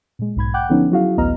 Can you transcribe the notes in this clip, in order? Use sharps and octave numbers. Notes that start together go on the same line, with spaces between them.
A#2 G#3
B1 G#2 B5 G#6
F#5 G5 D6 F#6 G6
D3 F3 B3 C#4 D#4
F#3 E4 F#4 G#4 F5
A1 D2 B3 D#5 A#5 F6